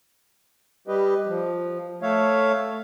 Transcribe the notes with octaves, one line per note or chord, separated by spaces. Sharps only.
G3 G4 B4 D#5
F3
A3 C#5 E5 F5